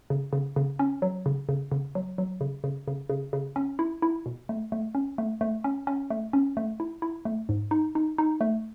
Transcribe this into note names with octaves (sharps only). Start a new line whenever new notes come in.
C#3
C#3
C#3
C#4
F#3
C#3
C#3
C#3
F#3
F#3
C#3
C#3
C#3
C#3
C#3
C#4
E4
E4
B2
A3
A3
C#4
A3
A3
C#4
C#4
A3
C#4
A3
E4
E4
A3
G#2
D#4
D#4
D#4
A3